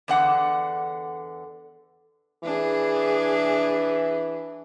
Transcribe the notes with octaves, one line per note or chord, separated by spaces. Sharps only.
E2 D3 F#5
E3 D4 G#4